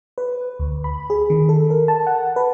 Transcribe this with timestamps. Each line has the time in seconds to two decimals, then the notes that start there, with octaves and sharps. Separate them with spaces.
0.18 B4
0.59 D2
0.84 B5
1.10 G#4
1.30 D#3
1.49 A4
1.70 A#4
1.88 A5
2.07 F#5
2.36 B4